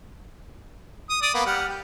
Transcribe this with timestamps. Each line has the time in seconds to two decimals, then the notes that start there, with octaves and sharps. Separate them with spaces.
1.10 D#6
1.22 D5 D#6
1.34 A#3 B3
1.46 G3 F#5 F6
1.69 G4